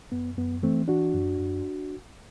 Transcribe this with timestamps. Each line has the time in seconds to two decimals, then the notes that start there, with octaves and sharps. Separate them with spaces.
0.12 F#2 B3
0.38 F#2 B3
0.63 E3 A3 C4
0.88 E3 D4 F#4
1.14 F#2
1.39 F#2